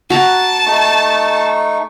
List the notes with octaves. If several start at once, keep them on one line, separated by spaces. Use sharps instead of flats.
F#4 A5 A#5
A3 D#4 C#6